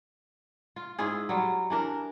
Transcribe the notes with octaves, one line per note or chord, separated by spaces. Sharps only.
F4
G#2 E4 F4 G#4
F#3 G3 F4
E3 D4 A#4